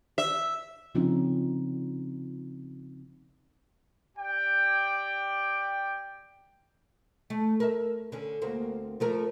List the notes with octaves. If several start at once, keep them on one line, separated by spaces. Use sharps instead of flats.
E5
C#3 F3 C4 C#4 D#4 F4
G4 D5 G5
A3
A#4 E5
D3 C#4
D2 A#3 C4
F3 A3 A#4